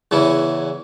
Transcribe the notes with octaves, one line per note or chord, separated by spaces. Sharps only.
E2 C#3 E3 C#4